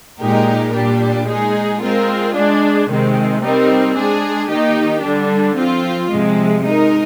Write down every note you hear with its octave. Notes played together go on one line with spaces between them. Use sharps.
A#2 G#3 D#4 G4 A#4
A#2 G3 D4 G4
G#3 D#4 G#4
G#3 C4 F4 A#4
G#3 D4 G#4
C3 D#3 G#3 C4
G3 C4 D#4 A#4
G#3 D4 G#4
D#3 A#3 D#4 G4
D3 G3 D4
F3 C4 F4
C3 F3 G#3
G#3 D#4 A#4